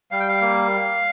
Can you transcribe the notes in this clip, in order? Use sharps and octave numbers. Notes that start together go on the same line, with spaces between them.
G3 F5
G5
F5
A#3